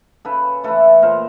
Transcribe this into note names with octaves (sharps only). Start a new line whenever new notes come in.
C#3 A4 B4
E3 A3 A4 B4
A#2 A#4 C5